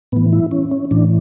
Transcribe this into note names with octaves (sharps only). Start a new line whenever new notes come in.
A2 E3 B3
E4
C#4
C#4
A2 E3 D4